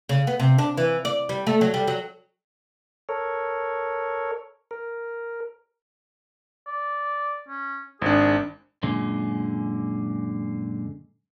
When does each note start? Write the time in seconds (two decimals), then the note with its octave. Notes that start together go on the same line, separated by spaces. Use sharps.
0.09 C#3
0.27 B3
0.40 C3
0.58 D4
0.77 E3
1.05 D5
1.29 G3
1.47 A3
1.61 F#3
1.74 G3
1.88 F#3
3.09 A4 A#4 C#5
4.71 A#4
6.67 D5
7.49 C#4
8.02 G#1 D4 G#4
8.83 F#2 A#2 D3 G#3